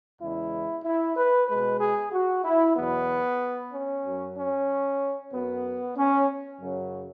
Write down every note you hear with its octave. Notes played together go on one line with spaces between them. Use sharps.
E2 C#3 G#3 E4
E4
B4
B2 G#3 B4
G#4
F#4
E4
E2 B2 F#3 B3
C#4
F#2 F#3
C#4
F#2 F#3 B3
C#4
F#2 C#3 F#3